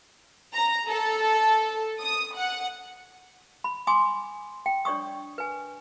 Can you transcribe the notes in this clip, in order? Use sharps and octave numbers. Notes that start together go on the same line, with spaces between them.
A#5
A4
D#6
F#5
B5
G#5 C6 D6 D#6
G5
D4 C#5 D5 C#6 D#6
B4 G#5